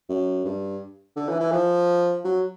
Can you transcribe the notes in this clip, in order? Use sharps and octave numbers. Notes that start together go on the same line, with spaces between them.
F#2
G2
D3
E3
E3
F3
F#3